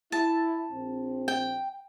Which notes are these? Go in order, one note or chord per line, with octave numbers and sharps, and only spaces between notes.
E4 A5
A#1 C4
G5